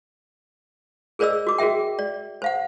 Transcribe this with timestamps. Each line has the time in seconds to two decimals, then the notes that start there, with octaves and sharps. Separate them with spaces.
1.19 G#4 A#4 C5 D5 D#5 E6
1.47 F#4 D6
1.58 F#4 G#4 A#4 E5 G5
1.99 D5
2.42 C5 F5 F#5